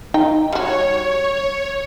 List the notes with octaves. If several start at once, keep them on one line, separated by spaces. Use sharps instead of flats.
D#4 G5
G3 F#4 C#5